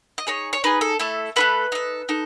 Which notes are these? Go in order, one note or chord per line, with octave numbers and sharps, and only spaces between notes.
D#5
D#4 G#4 C#5
C#5
D#4 G#4 B4
A4
A3 E4 A4
A3 E4 A4 B4
D#4 A4
D#4 A4